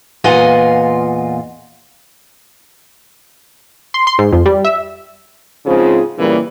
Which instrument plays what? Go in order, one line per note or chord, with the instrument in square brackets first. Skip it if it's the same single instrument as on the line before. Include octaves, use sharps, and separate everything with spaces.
[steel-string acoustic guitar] E2 A#2 F4 D#5 F#5 G#5
[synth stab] C6
C6
G#2
F2
G3
E5
[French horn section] G#2 C#3 F3 C4 F4 G#4
A#2 C#3 E3 G3 A#3